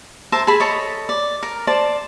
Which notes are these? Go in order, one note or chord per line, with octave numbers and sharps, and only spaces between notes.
A#4 C5 E5 A5
G#4 A5 B5
A4 C#5 D#5
D5
A#4
C5 D5 A5